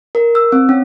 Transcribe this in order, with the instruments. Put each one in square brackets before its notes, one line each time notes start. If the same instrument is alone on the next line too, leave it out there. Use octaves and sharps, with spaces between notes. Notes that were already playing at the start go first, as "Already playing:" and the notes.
[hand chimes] A#4
E6
C4
C#4